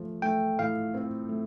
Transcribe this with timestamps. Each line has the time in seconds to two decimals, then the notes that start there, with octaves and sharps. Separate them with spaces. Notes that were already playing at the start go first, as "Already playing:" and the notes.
Already playing: F3 A3
0.22 A3 G5
0.59 A2 F5
0.94 C4
1.29 A3